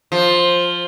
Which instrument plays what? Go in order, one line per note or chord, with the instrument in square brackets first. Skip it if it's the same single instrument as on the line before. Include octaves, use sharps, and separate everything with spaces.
[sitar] F3